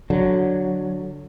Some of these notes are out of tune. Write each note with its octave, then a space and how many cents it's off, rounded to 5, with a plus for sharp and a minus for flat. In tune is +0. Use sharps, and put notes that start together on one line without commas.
D3 +0 F#3 +0